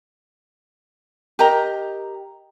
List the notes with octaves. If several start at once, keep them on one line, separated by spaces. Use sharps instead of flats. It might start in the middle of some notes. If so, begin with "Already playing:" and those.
G4 A#4 D#5 A#5